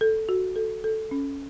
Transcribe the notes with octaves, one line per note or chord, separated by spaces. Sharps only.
A4
F#4
A4
A4
C#4